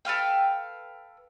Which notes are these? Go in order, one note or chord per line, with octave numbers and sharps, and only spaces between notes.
A4 B4 F5 G5